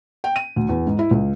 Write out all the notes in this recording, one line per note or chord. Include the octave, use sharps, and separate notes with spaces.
G5
D#7
D2
E2
G#2
E4
C#2